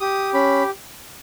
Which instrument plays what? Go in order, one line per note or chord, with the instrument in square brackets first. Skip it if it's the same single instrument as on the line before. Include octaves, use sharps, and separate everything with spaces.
[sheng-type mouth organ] G4 D#6
C#4 B5